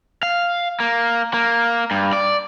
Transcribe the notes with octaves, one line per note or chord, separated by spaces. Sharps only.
F5
A#3
A#3
G2
D5